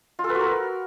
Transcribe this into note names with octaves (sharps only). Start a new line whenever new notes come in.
F4
A4
B4
F#4
A#4